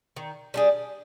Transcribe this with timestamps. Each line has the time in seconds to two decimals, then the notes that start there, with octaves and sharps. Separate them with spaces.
0.16 D#3
0.54 G3 D4 G#4